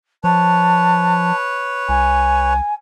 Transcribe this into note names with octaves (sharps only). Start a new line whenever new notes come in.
F3 B4 C#5 A5
C2 G#5